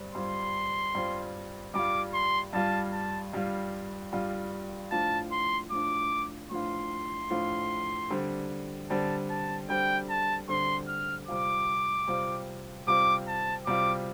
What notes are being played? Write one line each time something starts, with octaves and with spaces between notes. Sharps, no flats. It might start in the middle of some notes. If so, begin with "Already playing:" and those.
Already playing: G2 G3 C4
G2 G3 C4 F4 C6
G2 G3 C4 F4
G2 G3 F4 D6
C6
G2 G3 F4 A5
A5
G2 G3 F4
G2 G3 F4
A2 F3 D4 F4 A5
C6
A2 F3 D4 F4 D6
A2 F3 D4 F4 C6
A2 F3 D4 F4
D3 G3 C4
D3 G3 C4 A5
A5
D3 G3 C4 G5
A5
D3 G3 C4 C6
F6
C3 G3 C4 F4 D6
C3 G3 C4 F4
C3 G3 C4 F4 D6
A5
C3 G3 C4 F4 D6